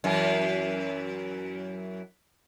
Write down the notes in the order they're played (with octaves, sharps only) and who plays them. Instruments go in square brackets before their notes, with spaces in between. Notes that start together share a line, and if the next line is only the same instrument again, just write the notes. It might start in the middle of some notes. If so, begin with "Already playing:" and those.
[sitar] F#2 E3